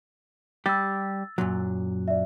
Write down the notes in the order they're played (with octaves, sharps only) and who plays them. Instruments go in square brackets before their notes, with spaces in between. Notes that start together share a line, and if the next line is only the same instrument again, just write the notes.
[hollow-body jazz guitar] G3 G4 [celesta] E6 A6
[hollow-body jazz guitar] F#2 A#2 F#3
[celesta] D5 E5